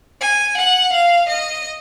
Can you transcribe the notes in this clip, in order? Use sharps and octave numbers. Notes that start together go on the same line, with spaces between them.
G#5
F#5
F5
D#5